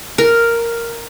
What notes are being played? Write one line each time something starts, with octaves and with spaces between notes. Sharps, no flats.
A#4